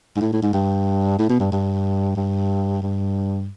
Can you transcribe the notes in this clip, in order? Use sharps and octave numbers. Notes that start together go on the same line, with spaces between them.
G#2
A2
A2
G#2
G2
A2
B2
G2
G2
G2
G2